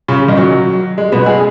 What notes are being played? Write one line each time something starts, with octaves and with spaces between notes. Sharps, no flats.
C#3 C#4
D#3 D#4
F#3
G#3
B2 B3
G#3 G#4